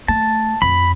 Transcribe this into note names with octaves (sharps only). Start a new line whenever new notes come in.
A3 A5
F2 B5